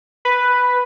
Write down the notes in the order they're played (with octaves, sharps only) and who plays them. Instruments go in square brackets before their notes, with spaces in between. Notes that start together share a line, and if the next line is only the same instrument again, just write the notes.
[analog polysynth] B4